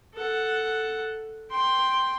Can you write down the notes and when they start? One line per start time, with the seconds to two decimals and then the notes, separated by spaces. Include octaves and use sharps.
0.15 A4 F#5
1.51 G5 C6